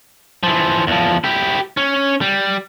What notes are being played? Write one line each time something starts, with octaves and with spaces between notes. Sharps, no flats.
E3 F3
E2 F3
E4 G4
C#4
G3